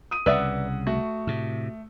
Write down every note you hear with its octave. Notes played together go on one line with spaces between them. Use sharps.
D#6 D#7
C2 C#3 B4 D5 E5 F#5 D#6 E6
A3 F#4
A2 C3